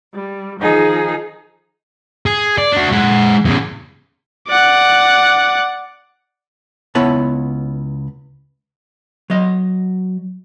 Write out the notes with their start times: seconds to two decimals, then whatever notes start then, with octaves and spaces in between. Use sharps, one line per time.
0.14 G3
0.60 D#3 F3 D#4 G#4
2.26 G#4
2.58 D5
2.72 D4 F#4
2.92 G#3 F#5
3.45 E2 C#3
4.47 D5 F#5
6.95 C#2 B3 E4 B4 C#5 A5
9.30 F#3 D#5